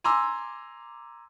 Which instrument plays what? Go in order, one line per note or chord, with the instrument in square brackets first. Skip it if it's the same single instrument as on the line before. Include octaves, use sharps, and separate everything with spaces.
[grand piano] G#5 A#5 C6 D6 E6